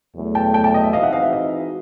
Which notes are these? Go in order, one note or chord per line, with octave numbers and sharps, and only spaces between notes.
E2 B2 F#3 A3
G5 A5
G5 A5
G5 A5
D#5
E5
E3 G#3 C4 D#4 F#4 D#5 F5
E5 F#5
D#5 F5
E5
D#5